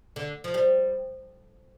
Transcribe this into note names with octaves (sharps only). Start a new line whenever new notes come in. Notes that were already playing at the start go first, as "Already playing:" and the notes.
D3
F3
G3